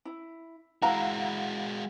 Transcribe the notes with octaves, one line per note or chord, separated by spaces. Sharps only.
E4
G#3 E4 F#4 F5 F#5 A#5